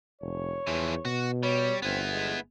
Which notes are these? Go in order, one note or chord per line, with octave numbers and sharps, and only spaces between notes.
F1 C#5
E2 E3 F3
B2 F#4
G3 C#5
G1 B3 C4 E4
G#3